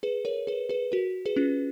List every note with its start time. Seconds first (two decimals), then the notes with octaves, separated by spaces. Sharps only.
0.03 G#4 B4
0.25 A#4 C#5
0.47 G#4 B4
0.69 G#4 B4
0.92 F#4 A#4
1.26 G#4 B4
1.36 C#4 F4